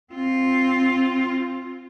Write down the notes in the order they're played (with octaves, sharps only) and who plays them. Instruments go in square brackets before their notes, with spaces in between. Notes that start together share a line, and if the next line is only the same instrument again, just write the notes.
[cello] C4 F4